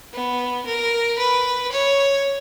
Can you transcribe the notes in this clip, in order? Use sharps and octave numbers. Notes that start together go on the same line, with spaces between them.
B3
A#4
B4
C#5